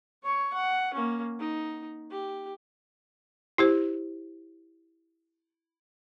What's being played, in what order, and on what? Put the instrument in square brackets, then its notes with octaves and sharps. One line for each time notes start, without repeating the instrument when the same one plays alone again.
[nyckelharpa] C#5 C#6
F#5
A#3 C#4
D#4
G4
[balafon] E4 G4 C5